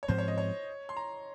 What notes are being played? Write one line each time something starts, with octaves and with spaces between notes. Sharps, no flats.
C#5
G#2 F3 C4 C5
C#5
D#5
C#5
C6
A#5